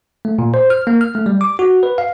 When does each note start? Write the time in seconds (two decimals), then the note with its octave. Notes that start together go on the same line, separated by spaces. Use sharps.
0.25 A3
0.39 A#2
0.54 C5
0.70 F6
0.87 A#3
1.01 F6
1.15 A3
1.26 G3
1.41 D6
1.59 F#4
1.83 B4
1.98 F5